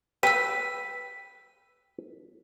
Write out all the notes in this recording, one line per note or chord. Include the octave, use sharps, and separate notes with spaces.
B4 G5 E6 B6 D#7